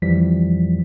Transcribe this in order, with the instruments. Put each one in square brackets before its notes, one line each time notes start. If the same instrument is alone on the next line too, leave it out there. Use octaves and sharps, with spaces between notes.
[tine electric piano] F2 E3 F3 G3 B6